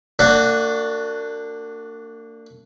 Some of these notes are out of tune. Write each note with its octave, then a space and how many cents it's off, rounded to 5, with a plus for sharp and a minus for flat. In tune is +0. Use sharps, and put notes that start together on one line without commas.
A#3 -40 D4 +0 F#4 +0